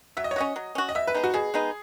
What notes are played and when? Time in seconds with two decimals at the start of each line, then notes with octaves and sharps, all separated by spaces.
0.17 F#3 E5
0.24 D#5
0.31 C#5
0.36 C#4 F#4 D#5
0.56 F#3
0.75 C#4 F#4
0.89 D#5
0.95 B2 E5
1.07 B4
1.14 G#3 B3 D#4
1.24 F#4
1.34 B2 G#4
1.54 G#3 B3 D#4